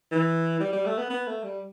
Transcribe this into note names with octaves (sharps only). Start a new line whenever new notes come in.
E3
G3
G3
A3
B3
B3
A3
G3